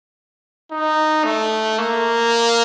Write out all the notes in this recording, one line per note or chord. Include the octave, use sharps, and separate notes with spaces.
D#4
A3
A#3